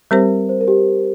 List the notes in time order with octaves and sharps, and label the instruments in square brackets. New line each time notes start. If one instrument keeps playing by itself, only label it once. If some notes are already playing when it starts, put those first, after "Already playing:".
[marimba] G3 C4 G4 C5 [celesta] A#4
[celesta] C5
A#4
G4